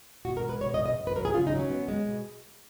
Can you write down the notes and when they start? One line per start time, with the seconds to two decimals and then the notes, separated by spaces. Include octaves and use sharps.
0.25 B2 F#4
0.37 A#4
0.44 G#3
0.49 B4
0.61 B2 C#5
0.74 D#5
0.80 B2
0.86 D#5
0.98 F#2
1.07 B4
1.16 F#3 A#4
1.25 G#4
1.34 C#3 F4
1.47 D#4
1.53 F#3
1.59 C#4
1.70 B3
1.88 G#3
2.06 B2